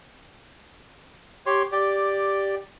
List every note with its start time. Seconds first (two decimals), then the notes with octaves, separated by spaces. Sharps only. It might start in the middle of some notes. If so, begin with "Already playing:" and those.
1.46 G4 C#5 C6
1.72 G4 D5